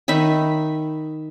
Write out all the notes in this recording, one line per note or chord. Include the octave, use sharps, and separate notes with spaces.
D#3 D#4 E5 B5